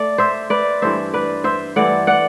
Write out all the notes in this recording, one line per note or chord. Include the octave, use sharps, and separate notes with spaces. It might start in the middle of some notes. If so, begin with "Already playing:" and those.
Already playing: A3 D5
C5 E5
B4 D5
G2 E3 A3 C5 E5
B4 D5
C5 E5
G2 E3 A3 D5 F#5
D5 F#5